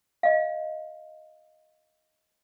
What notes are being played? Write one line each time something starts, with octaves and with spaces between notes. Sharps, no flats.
D#5 F5